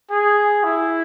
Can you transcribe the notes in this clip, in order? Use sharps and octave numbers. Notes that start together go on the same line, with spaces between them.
G#4
E4